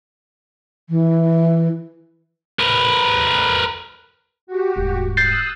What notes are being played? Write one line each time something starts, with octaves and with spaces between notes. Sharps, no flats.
E3
A#4 B4
F#4 G4
D#1 G#2
D#6 E6 F#6 G6 A6 C7